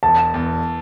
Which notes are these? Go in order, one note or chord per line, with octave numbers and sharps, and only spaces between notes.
E1 A5
E2